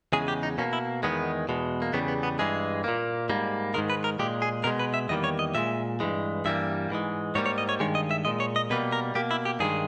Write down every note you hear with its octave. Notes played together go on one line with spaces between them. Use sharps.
E2 C#3 G#3 G#4
G4
D#4
B2 A#3 C#4
E4
E2 D#3 G#3 B3
E2 B2 G#3
A#3
E2 C#3 G3 B3
B3
B3
G2 E3 G#3 G#4
A#2 A#3
G#2 G3 A#3
G#2 D#3 G#3 A#4
B4
A#4
A#2 G#3 G4
G#4
B2 G#3 A#4
B4
E5
E2 D#3 G3 A#3 D#5
C#5
D#5
A#2 G#3 E5
G2 E3 G#3
G2 E3 G3 A#3 E5
G#2 E3 G#3
G#2 G3 A#3 C#5
C#5
D#5
C#5
G2 D#3 G#3 C#5
D#5
E5
A#2 G#3 D#5
C#5
D#5
B2 G3 A#3 B4
A#4
B2 A#3 G4
E4
G4
G2 D#3 G#3 G#4